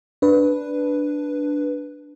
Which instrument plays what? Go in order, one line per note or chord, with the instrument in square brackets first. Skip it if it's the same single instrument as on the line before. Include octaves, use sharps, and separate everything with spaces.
[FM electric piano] D4 B4